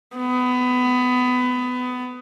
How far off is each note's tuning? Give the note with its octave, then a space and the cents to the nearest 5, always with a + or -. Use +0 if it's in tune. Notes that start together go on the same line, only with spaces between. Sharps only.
B3 +20